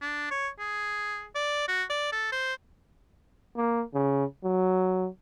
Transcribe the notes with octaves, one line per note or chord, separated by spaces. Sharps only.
D4
C#5
G#4
D5
F#4
D5
A4
C5
A#3
C#3
F#3